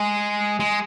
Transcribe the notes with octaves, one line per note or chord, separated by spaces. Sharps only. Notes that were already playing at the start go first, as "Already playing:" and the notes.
Already playing: G#3
G#3